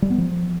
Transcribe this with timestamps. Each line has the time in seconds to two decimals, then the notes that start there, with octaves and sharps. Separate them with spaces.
0.02 G3
0.10 B3
0.18 F3